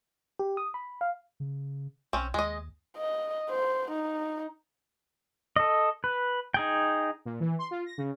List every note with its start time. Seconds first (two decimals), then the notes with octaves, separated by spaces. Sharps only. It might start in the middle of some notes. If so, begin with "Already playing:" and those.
0.39 G4
0.57 D#6
0.74 B5
1.01 F5
1.40 C#3
2.13 B1 C4 C#4
2.34 D#2 G#3 D#5
2.98 D#5
3.50 C5
3.91 D#4
5.56 A4 D#5
6.04 B4
6.54 D#4 G#4 G5
7.25 A#2
7.40 E3
7.59 C6
7.71 F4
7.86 A#6
7.98 C#3